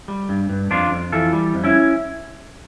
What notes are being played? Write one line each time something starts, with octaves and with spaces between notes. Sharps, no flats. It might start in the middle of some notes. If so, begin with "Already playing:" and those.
G3
G2
G2
F2 D4 F4
F2
E3 F4 A4
G3
F2
C#4 E4